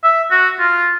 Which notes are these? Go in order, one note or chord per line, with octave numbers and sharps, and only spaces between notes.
E5
F#4
F4